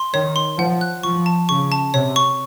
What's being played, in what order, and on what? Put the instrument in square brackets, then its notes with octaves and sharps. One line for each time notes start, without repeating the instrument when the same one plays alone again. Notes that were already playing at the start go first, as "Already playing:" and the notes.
Already playing: [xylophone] C6
[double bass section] D#3 [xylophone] C#5
[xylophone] C6
[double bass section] F3 [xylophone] F#5
[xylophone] F#6
[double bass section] F3 [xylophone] C#6
[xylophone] A5
[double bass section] C#3 [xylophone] C#6
[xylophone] A5
[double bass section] C3 [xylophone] C#5
[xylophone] C#6